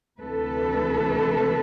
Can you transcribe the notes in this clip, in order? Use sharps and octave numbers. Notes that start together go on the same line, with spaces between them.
D2 C3 E3 A4 B4